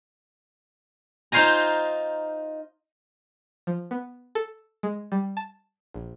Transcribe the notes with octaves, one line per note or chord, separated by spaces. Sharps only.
D#4 F4 C5 F5 G#5 A#5
F3
B3
A4
G#3
G3
A5
A#1